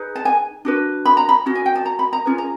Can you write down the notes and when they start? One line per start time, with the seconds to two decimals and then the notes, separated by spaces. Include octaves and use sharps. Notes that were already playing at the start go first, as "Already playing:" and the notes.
Already playing: D#4 G#4 B4
0.16 A5
0.25 G#5
0.65 D4 F#4 B4
1.05 B5
1.17 A#5
1.29 B5
1.46 C#4 F#4
1.55 G#5
1.66 G5
1.75 A5
1.85 A#5
1.99 B5
2.13 A#5
2.25 C#4 F4 G#4 B4
2.38 A#5